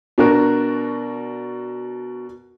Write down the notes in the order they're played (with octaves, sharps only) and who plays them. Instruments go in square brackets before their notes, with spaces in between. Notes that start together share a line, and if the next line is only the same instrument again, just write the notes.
[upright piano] B2 D4 F#4 A#4